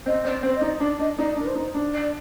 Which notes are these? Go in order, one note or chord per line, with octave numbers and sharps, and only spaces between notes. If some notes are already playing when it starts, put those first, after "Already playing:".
C4 D#5
C4 D5
C4 C5
D#5
D#4 D5
D4 D5
D4 D#5
D#4 D5
D4
A#4
C5
D#4
D4
D5